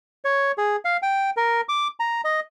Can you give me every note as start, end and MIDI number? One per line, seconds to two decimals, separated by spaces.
0.25 0.52 73
0.58 0.76 68
0.85 0.97 77
1.02 1.30 79
1.37 1.61 70
1.69 1.88 86
2.00 2.21 82
2.24 2.40 75